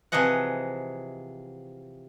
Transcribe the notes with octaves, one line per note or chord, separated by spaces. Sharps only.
C3 E3 F3 G#4 D#5 F#5